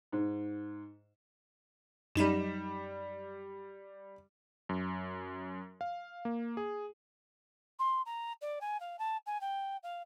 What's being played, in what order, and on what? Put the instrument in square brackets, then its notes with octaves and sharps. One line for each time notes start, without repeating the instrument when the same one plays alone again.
[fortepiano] G#2
[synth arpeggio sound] F#2 D#4 B5 [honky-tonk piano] G3 E7
[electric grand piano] F#2
F5
A#3
G#4
[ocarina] C6
A#5
D5
G#5
F5
A5
G#5
G5
F5